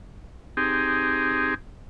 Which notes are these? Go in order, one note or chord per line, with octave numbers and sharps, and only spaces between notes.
C4 D#4 G4 G#4